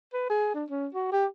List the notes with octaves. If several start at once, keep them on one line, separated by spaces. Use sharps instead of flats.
B4
G#4
D4
C#4
F#4
G4